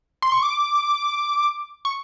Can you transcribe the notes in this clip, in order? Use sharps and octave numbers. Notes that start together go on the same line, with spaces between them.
C6
C#6
D6
C#6